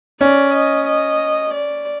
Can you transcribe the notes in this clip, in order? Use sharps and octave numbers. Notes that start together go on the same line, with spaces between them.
C#4 D5
D#5
D#5
D5